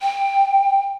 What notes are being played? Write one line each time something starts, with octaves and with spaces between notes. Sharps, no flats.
G5